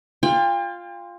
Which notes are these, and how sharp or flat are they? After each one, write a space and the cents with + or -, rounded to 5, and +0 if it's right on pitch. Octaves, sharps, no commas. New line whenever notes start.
F4 +0 G5 +40